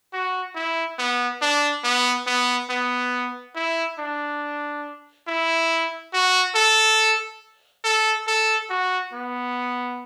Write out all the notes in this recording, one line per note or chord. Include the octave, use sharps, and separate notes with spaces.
F#4
E4
B3
D4
B3
B3
B3
E4
D4
E4
F#4
A4
A4
A4
F#4
B3